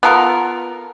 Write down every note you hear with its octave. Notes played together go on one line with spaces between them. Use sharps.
B3 F4 A4 A#4